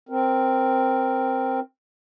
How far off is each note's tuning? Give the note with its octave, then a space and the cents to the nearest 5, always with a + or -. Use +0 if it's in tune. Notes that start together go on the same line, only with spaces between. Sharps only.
C4 +0 A#4 +0